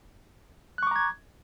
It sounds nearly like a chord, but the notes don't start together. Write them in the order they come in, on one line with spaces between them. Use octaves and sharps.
F#6 C#6 D6 A#5 G#6